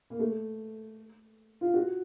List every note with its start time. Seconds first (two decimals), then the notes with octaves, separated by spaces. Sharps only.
0.10 A#3
0.19 A3
1.61 F4
1.74 F#4